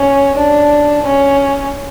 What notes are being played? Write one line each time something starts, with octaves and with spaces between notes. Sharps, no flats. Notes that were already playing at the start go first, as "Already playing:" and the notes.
Already playing: C#4
D4
C#4